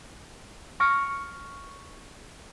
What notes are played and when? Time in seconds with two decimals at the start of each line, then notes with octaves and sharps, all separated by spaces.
0.80 C#6 F6 A#6 C#7 D7